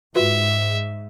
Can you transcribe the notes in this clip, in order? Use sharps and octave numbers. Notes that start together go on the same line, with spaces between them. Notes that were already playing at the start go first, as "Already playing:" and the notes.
G#2 F4 F#4 B4 E5